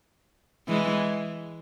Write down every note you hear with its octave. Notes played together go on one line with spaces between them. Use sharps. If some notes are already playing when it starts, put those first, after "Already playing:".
E3 G#3